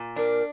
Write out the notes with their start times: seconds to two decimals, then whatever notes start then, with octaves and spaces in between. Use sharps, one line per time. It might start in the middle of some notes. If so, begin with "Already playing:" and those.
Already playing: A#2
0.16 D4 A#4